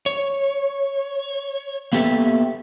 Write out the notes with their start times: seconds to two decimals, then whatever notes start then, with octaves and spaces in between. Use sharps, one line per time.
0.06 C#5
1.93 A#3 B3 G4 A4 B4 E5